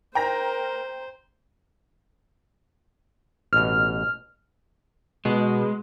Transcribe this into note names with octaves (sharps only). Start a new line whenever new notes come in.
A#4 C5 G5 A#5 A#6
A1 B2 F6
B2 G#3